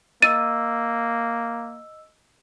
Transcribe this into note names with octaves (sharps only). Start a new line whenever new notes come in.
A#3 D#5 E6 A6 D#7